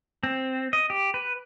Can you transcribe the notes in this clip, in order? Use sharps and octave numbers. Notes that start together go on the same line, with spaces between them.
C4
D#5
G4
B4